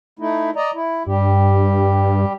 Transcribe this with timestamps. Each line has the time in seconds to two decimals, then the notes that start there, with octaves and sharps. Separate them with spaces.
0.19 A3 D#4 E4
0.56 D5 D#5 A#5
0.74 E4
1.07 G2 G3 G4